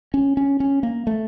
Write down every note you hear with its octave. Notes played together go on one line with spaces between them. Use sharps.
C#4
C#4
C#4
A#3
A3